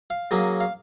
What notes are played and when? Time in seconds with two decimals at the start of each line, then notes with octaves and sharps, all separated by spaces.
0.10 F5
0.31 C#3 F#3 A#3 C#4
0.60 F5